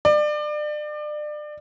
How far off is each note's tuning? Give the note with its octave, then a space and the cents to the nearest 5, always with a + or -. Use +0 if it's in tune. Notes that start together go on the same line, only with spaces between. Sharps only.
D5 +30